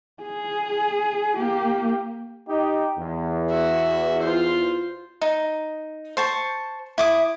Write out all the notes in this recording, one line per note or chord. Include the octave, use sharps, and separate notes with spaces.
G#4
A#3 G4
D#4 G4
E2
F#4 E5
F4 C5
D#4
C5 A5 C#6
E4 D6 D#6